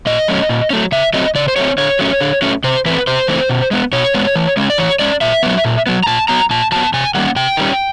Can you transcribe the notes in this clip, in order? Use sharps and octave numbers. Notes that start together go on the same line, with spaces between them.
A#2 D#5
F#3 A3 C#4
A#2
F#3 A3 C#4
C#3 E5
F#3 A3 C4 D#5
C#3 D5
C5
F#3 A3 C4 C#5
D3 C#5
F#3 A3 C#4
D3
F#3 A3 C#4
C3 C5
E3 A3 C4 B4
C3 C5
E3 A3 C4
B2
G#3 B3
B2 C#5
G#3 B3
E3
G#3 C#4
D5
E3 C#5
G#3 C#4 D5
A#2 E5
F#3 B3
A#2
F#3 B3
A#5
A#2 A5
F#3 B3 A#5
A#2 A5
F#3 B3 A5
C3 G#5
D#3 G3 A#3 C#4 F#5
C3 G5
D#3 G3 A#3 C#4